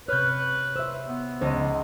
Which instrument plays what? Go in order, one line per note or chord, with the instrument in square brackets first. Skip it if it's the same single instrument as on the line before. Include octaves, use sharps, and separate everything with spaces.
[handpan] C3 C#5 [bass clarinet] B4 [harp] F6 G6
[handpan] C5 E5 [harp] E6
[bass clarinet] B3
[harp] C#2 D#5 [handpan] C5